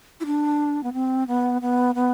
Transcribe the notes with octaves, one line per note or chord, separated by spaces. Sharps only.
E4
D4
B3
C4
B3
B3
B3